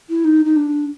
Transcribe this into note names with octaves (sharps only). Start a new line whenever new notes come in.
E4
D#4
D#4
D4